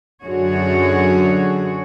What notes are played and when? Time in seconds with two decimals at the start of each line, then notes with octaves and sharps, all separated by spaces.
0.23 F#2 D3 F#4 G#4 C#5